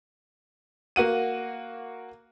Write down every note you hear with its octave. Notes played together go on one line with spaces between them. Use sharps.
A#3 F#4 F#5 D#7